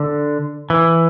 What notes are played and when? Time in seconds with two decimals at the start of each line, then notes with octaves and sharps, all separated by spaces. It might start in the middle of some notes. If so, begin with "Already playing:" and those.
Already playing: D3
0.70 E3